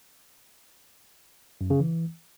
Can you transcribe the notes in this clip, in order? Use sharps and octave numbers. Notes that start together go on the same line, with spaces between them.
F#2
C#3
E3